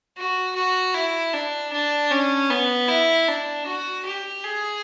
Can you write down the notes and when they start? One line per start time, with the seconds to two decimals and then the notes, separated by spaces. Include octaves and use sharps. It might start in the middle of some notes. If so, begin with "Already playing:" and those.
0.17 F#4
0.56 F#4
0.94 E4
1.33 D4
1.73 D4
2.11 C#4
2.50 B3
2.88 E4
3.28 D4
3.66 F#4
4.05 G4
4.44 G#4